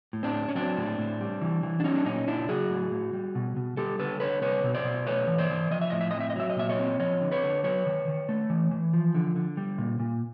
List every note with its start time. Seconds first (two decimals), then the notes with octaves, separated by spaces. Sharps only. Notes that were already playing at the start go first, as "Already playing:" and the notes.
0.13 A2
0.23 C4 D4
0.34 C4
0.49 C#4
0.55 F#3 C4 D4
0.77 A2
0.99 A2
1.20 G3
1.42 E3
1.63 E3
1.80 D4
1.84 F#3 C#4 D#4
1.96 D4
2.06 A#2 C#4 D#4
2.27 A#2 D4 E4
2.49 F#3 F#4 G#4
2.70 A2
2.91 A2
3.13 G3
3.35 B2
3.56 B2
3.77 G3 G4 A4
3.99 D3 A4 B4
4.20 D3 B4 C#5
4.42 G3 B4 C#5
4.64 B2
4.74 C5 D5
4.84 B2
5.07 A3 B4 C#5
5.27 E3
5.38 C5 D5
5.50 E3
5.71 F3 D#5
5.81 E5
5.90 A2 D#5
6.01 E5
6.11 C4 D#5
6.20 E5
6.30 D#5
6.36 F#3 E5
6.50 D#5
6.56 A#2 E5
6.69 C#5 D#5
6.79 C4
7.00 F3 C#5 D#5
7.21 D3
7.32 B4 C#5
7.43 D3
7.64 F#3 B4 C#5
7.86 D#3
8.08 D#3
8.29 A3
8.50 E3
8.71 E3
8.93 F3
9.15 D3
9.36 D3
9.57 G3
9.78 A#2
10.00 A#2